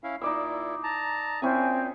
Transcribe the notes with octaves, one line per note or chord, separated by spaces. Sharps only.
C#4 E4 F5
A#2 D#4 E4 D5 E6
A5 A#5
A#2 C4 C#4 E4 G#5